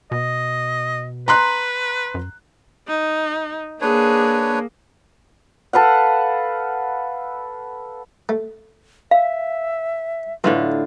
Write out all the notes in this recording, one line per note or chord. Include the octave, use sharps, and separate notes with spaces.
B2 D#5
B4 A#5 C6 F#6
F#2
D#4
A#3 D4 G#4 B4 C#5
A4 B4 F5 F#5
A3
E5 F5
F#2 A2 D3 E3 A3 F4